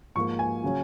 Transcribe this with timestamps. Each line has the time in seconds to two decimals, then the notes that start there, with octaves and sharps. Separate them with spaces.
0.15 G#2 F3 A#3 C#6
0.39 G#5
0.64 C#3 F#3 C#4